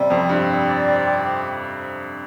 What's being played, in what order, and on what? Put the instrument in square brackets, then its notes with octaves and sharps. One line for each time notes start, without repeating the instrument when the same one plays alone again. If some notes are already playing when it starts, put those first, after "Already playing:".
Already playing: [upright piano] C3 [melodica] G3
[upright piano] F2 [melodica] C4
[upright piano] G2 [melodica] C4
[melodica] G3
D5
C4
G4
C4